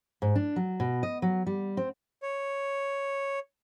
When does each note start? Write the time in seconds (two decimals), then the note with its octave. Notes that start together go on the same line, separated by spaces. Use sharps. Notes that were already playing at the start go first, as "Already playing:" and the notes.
0.22 G#2
0.35 D4
0.56 F#3
0.80 B2
1.03 D#5
1.22 F#3
1.46 G3
1.77 C4
2.22 C#5